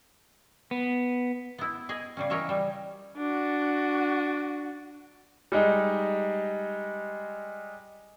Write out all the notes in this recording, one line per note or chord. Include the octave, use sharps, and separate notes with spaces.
B3
B3 E4
G#4 D#5 G#5
C#3 G3 C#4
E3 A#4 C#5 D#5 E5
G3
D4 F#4
G3 G#3 D#4